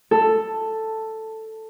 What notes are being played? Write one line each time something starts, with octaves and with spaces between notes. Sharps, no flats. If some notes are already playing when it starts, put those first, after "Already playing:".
A4